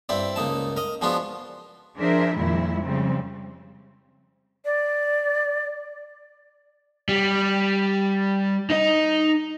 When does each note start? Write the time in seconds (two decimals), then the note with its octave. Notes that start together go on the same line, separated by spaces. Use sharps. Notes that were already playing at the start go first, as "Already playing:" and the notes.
0.09 G2 C4 E4 D5
0.36 C#2 A#3 D#4 A5
0.77 A#4 D#5
1.01 F3 G#3 B3 D4 F4 F#4
1.97 F3 D4 G#4 A#4 C5 E5
2.35 F2 A#2 D#3 G3 G#3 E4
2.83 C#3 F3 G3 C4
4.65 D5
7.09 G3
8.70 D#4 D#5